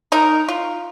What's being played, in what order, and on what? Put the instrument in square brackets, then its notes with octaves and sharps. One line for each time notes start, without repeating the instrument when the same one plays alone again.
[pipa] D#4 A#4
F4